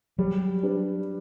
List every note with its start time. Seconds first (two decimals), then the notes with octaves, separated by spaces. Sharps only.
0.19 F#3 G3
0.63 D4 G4 B4